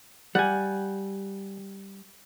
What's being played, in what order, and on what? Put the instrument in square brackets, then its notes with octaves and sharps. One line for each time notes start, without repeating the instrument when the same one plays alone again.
[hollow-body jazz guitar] G3 [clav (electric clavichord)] F#5 G#5